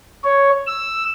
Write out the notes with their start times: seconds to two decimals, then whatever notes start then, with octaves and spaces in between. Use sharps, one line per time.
0.24 C#5
0.67 E6